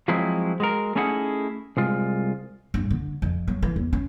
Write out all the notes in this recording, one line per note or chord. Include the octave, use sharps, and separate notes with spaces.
F3 F#3 G#3 C4 E4
G#3 F#4 A#4
A3 C#4 D#4 E4 G#4 F#5
C2 G#3 F4
G2
D3
F2
F#3
E3
E2
C#4